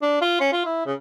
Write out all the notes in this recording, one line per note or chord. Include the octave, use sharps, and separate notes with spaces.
D4
F4
C#4
F4
E4
C#3